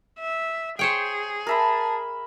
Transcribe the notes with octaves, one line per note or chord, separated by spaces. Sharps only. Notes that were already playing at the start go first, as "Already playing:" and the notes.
E5
G#4 C5 C#5 G5
A#4 E5 A5 B5